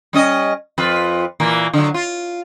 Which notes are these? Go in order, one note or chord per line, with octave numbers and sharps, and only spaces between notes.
G3 C#4 D#5
F2 F4 B4
A#2 E3 A#3
D3 F#3
F4